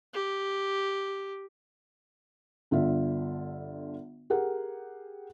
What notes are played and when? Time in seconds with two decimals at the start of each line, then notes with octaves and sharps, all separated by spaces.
0.14 G4
2.71 G1 D3 F4 E5
4.30 G4 G#4 A#4 F#5